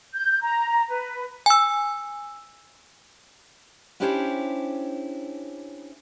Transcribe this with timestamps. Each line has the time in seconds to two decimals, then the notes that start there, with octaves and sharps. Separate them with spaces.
0.14 G6
0.41 A#5
0.90 B4
1.46 G#5 E6
4.00 C#4 D4 E4 G4 C5 C#5